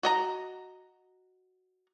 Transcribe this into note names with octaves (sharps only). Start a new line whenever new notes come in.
F#4 D#5 A#5